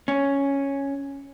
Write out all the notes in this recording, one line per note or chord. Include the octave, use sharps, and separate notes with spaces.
C#4